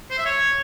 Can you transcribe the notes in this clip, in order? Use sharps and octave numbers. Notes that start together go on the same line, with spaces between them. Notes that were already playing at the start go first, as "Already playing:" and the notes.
C5
E5
C#5